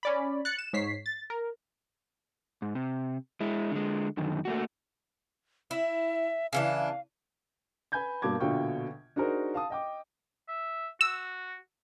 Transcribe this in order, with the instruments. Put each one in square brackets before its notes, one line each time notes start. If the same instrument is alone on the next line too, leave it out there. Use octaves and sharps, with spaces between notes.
[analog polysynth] C#4 D5 B5
F#6 A6 C#7
E7
G#2 C#5 B6 C7
A6
A#4
[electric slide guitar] G#2
C3
G#3 E4
D3 G#3
F#2 D3 D#3
A3 A#3 F#4
[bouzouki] E4 [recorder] E5
[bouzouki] C#3 E3 D4 [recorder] F5
[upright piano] B4 G#5 B5 G6 G#6
G2 B2 A#3 A5 D6 G#6
A#1 B2 D3 F4 G5 C#6
D4 D#4 F#4 G#4 A#4 C5
F5 A5 D#6
D#5 G5 D6
[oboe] E5
[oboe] F#4 [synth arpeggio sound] E6